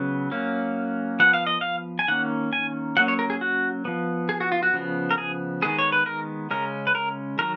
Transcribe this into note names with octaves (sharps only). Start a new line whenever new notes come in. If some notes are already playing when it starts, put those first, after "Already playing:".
Already playing: C#3 F#3 B3
F#3 A#3 C#4
F3 B3 F#5
F5
D#5
F5
G#5
D#3 A#3 C#4 F#5
G#5
F#3 A#3 C#4 F#5
C#5
A#4
G#4
F#4
F3 B3
G#4
F#4
F4
F#4
C#3 F3 B3
A#4
G#4
D#3 G#3 B3 G#4
C#5
B4
A#4
C#3 G#3 C#4 A#4
B4
A#4
D#3 F#3 A#4